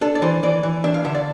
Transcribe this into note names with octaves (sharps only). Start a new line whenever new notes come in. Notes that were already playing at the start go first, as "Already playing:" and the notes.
D4 A4
D5
E3 C5
E3 D5
E3
D4 E5
F5
D3 E5
D5